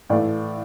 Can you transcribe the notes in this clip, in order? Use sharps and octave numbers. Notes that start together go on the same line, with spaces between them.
A2 E3 A3 D5 F5